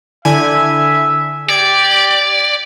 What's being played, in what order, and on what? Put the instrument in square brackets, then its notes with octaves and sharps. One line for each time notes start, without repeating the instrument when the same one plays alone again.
[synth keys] D3 E4 G#5 [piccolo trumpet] E5
[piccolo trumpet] G4 [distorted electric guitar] D5 [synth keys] G#6